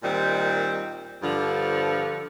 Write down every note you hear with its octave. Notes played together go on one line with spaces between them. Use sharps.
A#2 D#3 G3 C4
G2 D3 F3